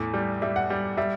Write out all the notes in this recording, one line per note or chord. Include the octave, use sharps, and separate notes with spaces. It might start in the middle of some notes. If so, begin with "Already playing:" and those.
Already playing: E2 A2
G3
G3 E5
F#5
G3
G3 E5